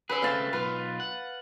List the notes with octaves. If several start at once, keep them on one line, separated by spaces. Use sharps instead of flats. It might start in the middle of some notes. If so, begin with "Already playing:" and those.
C#4 G#4 B4 E6
C#3 A3 C4 F5 A5
B1 F4 B4
F#5